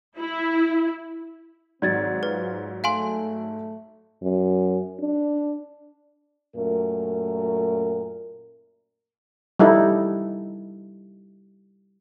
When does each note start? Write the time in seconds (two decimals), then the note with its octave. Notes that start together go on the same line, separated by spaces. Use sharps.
0.18 E4
1.82 G#2 D#3 F#3 C4 D5 G#6 A6
2.23 F4 G#4 B4 C5
2.84 A3 F5 G#5 C6
4.22 F#2
5.00 D4
6.56 F#2 A#2 A3 A#4
9.59 G3 D#4 E4 A4